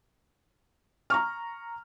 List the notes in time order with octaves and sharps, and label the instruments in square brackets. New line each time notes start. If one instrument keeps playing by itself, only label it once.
[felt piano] A#5 C#6 F6